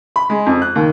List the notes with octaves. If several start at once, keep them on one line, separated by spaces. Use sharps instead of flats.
B5
G#3
F2
F#6
D#2